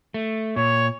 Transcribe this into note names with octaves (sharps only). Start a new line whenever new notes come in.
A3
A#2 C#5